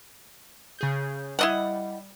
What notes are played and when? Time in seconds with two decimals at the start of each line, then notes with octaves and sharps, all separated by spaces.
0.79 C#3 G#4 G6
1.39 G3 E4 D#5 F#5